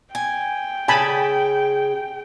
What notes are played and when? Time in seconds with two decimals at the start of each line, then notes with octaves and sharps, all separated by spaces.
0.15 G5 G#5
0.88 C#3 G#4 G#5 A5 B5